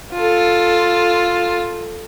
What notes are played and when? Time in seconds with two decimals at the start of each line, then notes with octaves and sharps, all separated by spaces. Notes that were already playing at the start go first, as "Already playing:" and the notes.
0.13 F4 A4